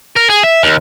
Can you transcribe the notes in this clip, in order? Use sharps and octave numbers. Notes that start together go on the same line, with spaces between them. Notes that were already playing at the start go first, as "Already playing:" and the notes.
A#4
G#4
E5
D#2